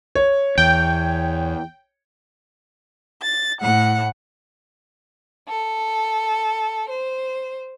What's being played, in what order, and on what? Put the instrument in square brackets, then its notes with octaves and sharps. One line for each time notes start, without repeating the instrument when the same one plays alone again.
[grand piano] C#5
[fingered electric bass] E2 [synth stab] G5
[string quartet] A6
A2 F#5
A4
C5